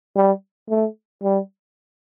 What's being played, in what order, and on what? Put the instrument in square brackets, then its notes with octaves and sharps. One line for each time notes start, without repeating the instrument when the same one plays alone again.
[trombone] G3
A3
G3